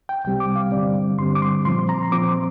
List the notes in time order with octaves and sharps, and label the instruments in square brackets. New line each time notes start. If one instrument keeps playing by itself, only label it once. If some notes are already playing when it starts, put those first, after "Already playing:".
[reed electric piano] G5
C2 C3 G3 C4 G5
D6
F5
G2 D3 G3 C4 D5
G2 D3 G3 C4 C6
D6
C6
A#2 F3 C4 C6
A#5
C6
A#2 F3 C4 D6
C6